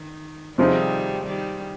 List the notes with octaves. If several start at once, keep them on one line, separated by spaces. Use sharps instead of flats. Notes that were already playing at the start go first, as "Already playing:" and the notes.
Already playing: D#3
C3 D#3 F3 G3 C4 D#4 G#4
D#3 G3